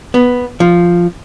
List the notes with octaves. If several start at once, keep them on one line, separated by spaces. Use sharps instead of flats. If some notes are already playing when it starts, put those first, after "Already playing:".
B3
F3